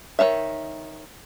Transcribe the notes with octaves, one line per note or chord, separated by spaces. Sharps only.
D#3 C#4 C#5 E5